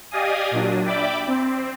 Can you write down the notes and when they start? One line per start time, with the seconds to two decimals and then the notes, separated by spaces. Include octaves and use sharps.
0.11 G4 D5 D#5 F5 G#5 D#6
0.51 A#2 F#3 D4
0.86 D5 E5 G5 B5 D6
1.27 C4